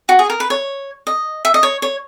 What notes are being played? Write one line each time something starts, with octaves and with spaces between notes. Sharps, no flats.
F#4
G#4
A#4
B4
C#5
D#5
E5
D#5
C#5
C#5